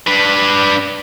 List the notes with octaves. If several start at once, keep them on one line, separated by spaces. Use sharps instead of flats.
D4 B4